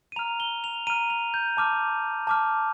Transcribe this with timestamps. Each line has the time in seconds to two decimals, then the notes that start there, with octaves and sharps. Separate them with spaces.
0.12 D#7
0.16 A#5 F7
0.19 F6
0.40 G7
0.64 F7
0.87 A#5 F6 D#7
1.10 F7
1.34 G6
1.57 A5 D6 F6
2.27 A5 D6 F6